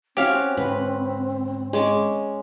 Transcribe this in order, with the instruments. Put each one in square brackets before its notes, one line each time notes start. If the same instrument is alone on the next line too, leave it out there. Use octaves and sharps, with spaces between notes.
[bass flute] C4 [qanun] C#4 F#4 [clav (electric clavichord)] G4 F5
[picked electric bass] G#2 D3 [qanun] B4
[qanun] G#3 C#4 D6